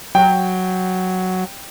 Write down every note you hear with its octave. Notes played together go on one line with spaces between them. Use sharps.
F#3 G5